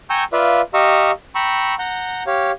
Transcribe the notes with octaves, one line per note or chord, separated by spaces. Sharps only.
G5 G#5 A#5 C#6 E6 G6
F4 B4 D5 E5 F5
G4 D#5 F5 A#5 C#6 E6
G5 A#5 B5 C#6 E6
F#5 A#5 G6
G4 C#5 F5